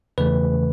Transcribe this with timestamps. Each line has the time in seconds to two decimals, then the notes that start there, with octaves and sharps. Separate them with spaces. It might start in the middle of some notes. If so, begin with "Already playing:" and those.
0.18 E2 C#3 E3 A3 B4